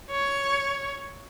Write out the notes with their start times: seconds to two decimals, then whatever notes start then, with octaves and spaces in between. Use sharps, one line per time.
0.11 C#5